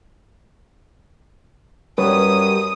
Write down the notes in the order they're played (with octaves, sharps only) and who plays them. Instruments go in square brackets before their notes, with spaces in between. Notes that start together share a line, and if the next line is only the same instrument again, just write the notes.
[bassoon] F#2 [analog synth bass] G3 [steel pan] B4 C#5 [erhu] D#6